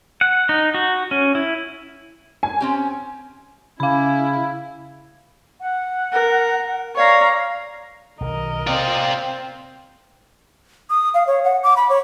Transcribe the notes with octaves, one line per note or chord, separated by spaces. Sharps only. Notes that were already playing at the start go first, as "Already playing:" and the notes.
F#5
D#4
F#4
C#4
E4
G#5
C4 C#4 G4
C#3 C#4 E4 F5 B5
F#5
A#4
C#5 D5 F5 A#5
B1 D#3 A#4 D#5
C3 C4 F4 D5
D#6
F5
C#5
F#5
D6
B5
C#5